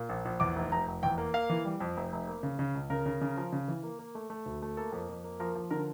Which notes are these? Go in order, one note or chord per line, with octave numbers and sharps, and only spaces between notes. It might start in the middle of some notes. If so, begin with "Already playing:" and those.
Already playing: A#2
A#1
A#1
E2 D6
F1
F1 A#5
F1
E2 G5
A#3
A#3 F5
E3
G3
F2
F1
F1
A#3
C#3
C#3
C#2
C#3 A#4
C#3
C#3
F3
C#3
E3
A#3
A#3
A3
A3
D2
A3
A#3 A4
F2
F2
A#3
F3 A#4
F3
D3 A#4